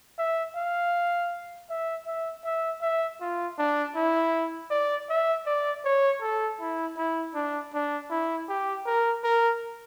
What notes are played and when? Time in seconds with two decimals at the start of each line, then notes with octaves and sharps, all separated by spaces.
0.19 E5
0.55 F5
1.70 E5
2.06 E5
2.44 E5
2.82 E5
3.21 F4
3.58 D4
3.95 E4
4.70 D5
5.09 E5
5.46 D5
5.85 C#5
6.21 A4
6.60 E4
6.97 E4
7.35 D4
7.73 D4
8.10 E4
8.49 G4
8.86 A#4
9.24 A#4